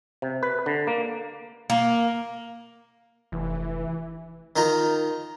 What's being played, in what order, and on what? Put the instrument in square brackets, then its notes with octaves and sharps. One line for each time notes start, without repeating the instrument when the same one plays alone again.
[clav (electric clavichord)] C3
B4
D3
A#3
[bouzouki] A#3
[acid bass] F1 [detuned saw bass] E3
[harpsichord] D#3 D#4 F4 A#5